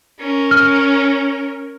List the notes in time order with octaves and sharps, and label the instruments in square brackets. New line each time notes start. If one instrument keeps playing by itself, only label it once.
[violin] C#4 A#4
[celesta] F6